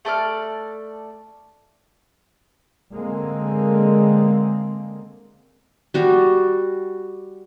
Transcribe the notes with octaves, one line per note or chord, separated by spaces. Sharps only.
A3 A4 D5 F6
D3 G#3 A#3 C4
G3 F#4